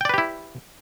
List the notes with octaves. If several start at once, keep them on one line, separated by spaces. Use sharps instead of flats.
E4 G4 B4 D5 G5